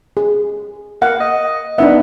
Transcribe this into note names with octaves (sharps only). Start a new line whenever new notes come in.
G#4
A#3 F5 F#5
D#5
B3 D4 D#4 E5